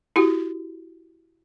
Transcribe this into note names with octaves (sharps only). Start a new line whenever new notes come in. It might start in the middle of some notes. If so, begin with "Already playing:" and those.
E4 F#4 G4